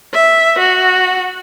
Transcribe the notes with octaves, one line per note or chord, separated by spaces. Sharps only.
E5
F#4